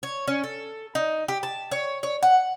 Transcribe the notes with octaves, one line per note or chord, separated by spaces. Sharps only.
C#5
C#4
A4
D#4
G4
A5
C#5
C#5
F#5